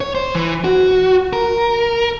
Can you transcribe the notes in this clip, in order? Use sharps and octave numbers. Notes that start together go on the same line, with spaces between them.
C#5
C5
E3
F#4
A#4